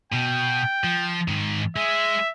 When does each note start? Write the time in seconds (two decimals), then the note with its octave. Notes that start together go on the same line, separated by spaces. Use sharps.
0.12 B2 G5
0.84 F3
1.28 G#2 D#3
1.76 G#3 E5